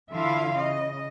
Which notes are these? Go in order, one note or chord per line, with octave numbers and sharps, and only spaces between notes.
D3 E3 E4 F4 E5 F5
C#3 D#5